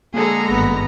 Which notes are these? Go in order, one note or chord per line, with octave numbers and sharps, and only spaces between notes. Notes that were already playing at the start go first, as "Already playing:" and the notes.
D3 G#3 A#3 G#4 A4 A#5
G#1 G2 B3